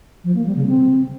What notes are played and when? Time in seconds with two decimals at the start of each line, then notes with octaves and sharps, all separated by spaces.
0.24 F3
0.35 A#3
0.46 G3
0.56 C#3
0.67 C4